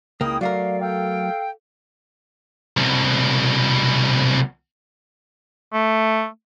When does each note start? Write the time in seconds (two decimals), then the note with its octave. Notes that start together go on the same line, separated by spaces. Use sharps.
0.21 C#2 A#3 E4 G5 D#6
0.41 F#3 A3 A#4 D5 F5
0.81 A4 F5 G5
2.77 C2 B2
5.73 A3